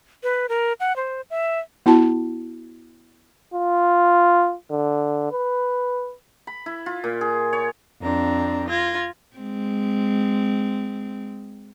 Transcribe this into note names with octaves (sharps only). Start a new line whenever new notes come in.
B4
A#4
F#5
C5
E5
B3 E4 F#4 A5
F4
D3
B4
B5
E4
F4
A#2
G#4
C#5
F2 C4 D4 A#5
F4 G#6 A#6
G#3 C4